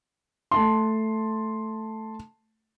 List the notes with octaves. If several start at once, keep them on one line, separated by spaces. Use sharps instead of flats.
A3 A5 C6